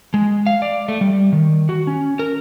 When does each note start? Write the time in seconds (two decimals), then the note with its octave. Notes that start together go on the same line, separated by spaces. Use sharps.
0.14 G#3
0.46 F5
0.62 D5
0.88 A3
1.01 G3
1.33 D#3
1.69 F#4
1.87 C#4
2.19 A#4